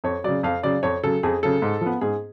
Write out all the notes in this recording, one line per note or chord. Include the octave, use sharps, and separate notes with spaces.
F2 C#5
C#3 F#3 D5
F2 F5
C#3 F#3 D5
F2 C#5
C#3 F#3 A4
F2 G#4
C#3 F#3 A4
G#2
F3 B3
G#2 G#4